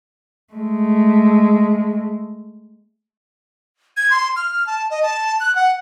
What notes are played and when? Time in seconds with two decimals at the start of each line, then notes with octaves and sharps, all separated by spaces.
0.54 G#3 A3
3.97 G#6
4.10 C6
4.36 F6
4.67 A5
4.91 D#5
5.03 A5
5.40 F#6
5.56 F#5